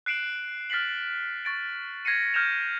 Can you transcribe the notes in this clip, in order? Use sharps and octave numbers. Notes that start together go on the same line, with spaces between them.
F#6 C7 D7 E7 F#7
F6 A6 B6 C7 F#7
C#6 A6 D7
G#6 A#6 C7 C#7 D#7
F6 G6 G#6 A#6 E7 F7